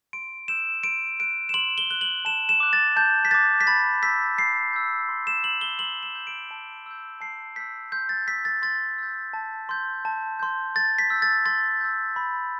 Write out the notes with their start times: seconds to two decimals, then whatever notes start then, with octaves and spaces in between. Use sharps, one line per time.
0.13 C6 D7
0.48 E6 G6 E7
0.83 C6 D7
1.20 F#6 D7
1.49 E7
1.54 C6 F#7
1.78 G7
1.91 F#6 G7
2.01 F#7
2.25 A5 E7
2.49 E7
2.60 D6 F#6
2.73 A6
2.96 A5 G6
3.25 B6
3.31 D6 F#6 A6
3.61 B6
3.67 B5 A6
4.02 E6 G6 B6
4.38 B5 C7
4.73 E6 G6
5.09 C6
5.27 E7
5.44 G6 F#7
5.61 G7
5.79 C6 F#7
6.03 E7
6.15 G6
6.27 D7
6.51 A5
6.86 E6 G6
7.21 A5 C7
7.56 E6 G6 B6
7.92 C6 G6
8.09 A6
8.27 E6 B6
8.31 G6
8.45 A6
8.62 C6 A6
8.98 E6 G6
9.34 A5
9.69 C6 G6
10.05 A5
10.40 C6 G6
10.75 C6 A6
10.98 B6
11.10 E6 G6
11.22 A6
11.45 C6 A6
11.81 E6 G6
12.16 B5